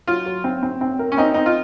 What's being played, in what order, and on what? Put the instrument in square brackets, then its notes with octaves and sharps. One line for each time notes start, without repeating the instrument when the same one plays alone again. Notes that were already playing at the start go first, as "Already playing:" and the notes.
[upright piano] F#3 [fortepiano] F4
[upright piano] F#3
C4
C4
C4
A#4
[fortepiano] C#4
[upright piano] C4 [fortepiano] D#4
[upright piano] C4 [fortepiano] D#4
[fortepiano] F4